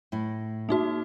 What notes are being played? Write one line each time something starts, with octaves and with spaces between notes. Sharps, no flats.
A2 E4
A#3 D#4 F#4